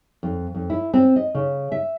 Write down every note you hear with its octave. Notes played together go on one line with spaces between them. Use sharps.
F2
F2
E4
C4
D#5
C#3
E5